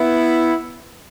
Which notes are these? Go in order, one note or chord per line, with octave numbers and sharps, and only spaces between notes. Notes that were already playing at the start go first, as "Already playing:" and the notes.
Already playing: B3 E4